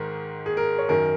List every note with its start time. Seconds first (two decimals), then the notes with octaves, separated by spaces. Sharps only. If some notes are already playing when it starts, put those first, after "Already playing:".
Already playing: G#2 D#3 A#4
0.46 G#4
0.57 A#4
0.78 C#5
0.89 F#2 D#3 A#4